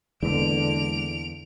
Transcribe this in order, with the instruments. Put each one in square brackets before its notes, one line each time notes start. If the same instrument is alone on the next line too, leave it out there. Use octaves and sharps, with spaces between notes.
[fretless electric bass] E2 [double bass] D3 [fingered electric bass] G#3 A#3 [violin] D7 F7